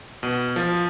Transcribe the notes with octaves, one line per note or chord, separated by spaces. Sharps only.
B2
F3